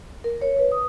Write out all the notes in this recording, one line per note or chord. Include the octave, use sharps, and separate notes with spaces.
A#4
C#5
B4
D#6